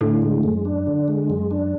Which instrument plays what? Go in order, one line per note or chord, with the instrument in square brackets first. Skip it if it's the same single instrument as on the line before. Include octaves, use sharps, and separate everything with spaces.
[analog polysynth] A2 [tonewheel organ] D3
[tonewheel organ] G#3
F#2
D4
D3
G#3
F#2
D4